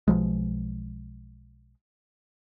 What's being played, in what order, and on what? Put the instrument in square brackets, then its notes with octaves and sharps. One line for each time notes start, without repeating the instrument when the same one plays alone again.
[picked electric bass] B1 F3 G#3